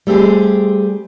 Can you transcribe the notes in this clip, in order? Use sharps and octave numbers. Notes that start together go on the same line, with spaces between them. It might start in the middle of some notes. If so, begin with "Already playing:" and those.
G3 A3 C4 G4 G#4